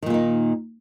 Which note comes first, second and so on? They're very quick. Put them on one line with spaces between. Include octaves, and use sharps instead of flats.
D#3 A#2 A#3 D#4